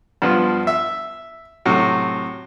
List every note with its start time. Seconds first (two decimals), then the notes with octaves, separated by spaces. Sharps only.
0.22 G2 F3 B3 F4
0.67 E5
1.65 A2 C3 F#3